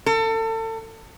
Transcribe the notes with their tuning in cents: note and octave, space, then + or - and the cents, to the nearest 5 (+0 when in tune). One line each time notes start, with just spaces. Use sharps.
A4 +30